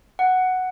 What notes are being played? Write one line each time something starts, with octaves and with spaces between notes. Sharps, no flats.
F#5